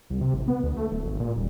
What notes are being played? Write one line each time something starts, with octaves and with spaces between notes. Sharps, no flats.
C2
C3
A1
B3
D2
A3
D1
G#1
A#2
D#1